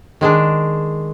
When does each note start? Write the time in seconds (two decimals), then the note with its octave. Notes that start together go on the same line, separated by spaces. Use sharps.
0.21 D#3 G#3 D4